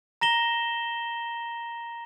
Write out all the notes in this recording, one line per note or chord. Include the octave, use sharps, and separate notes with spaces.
A#5 A#6 E7 G7